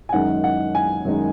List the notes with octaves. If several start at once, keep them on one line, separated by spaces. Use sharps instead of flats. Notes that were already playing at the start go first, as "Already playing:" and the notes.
G#5
F#2 D#3 G#3 D#4 F#5
F#5
G#5
F#2 D#3 G#3 D#4